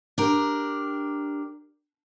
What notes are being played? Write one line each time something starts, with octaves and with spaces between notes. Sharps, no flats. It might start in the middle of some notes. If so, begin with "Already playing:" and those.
D4 G4 A#4